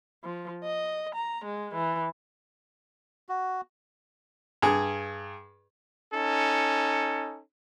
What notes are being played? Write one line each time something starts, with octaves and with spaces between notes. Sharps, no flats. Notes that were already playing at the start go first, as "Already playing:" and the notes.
F3
D#5
A#5
G#3
E3
F#4
G2 G#4
C#4 D#4 A4